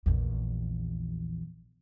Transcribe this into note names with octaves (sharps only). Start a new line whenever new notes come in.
A#1 E2